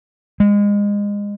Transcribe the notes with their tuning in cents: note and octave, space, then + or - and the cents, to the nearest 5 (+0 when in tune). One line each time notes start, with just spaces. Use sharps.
G#3 -25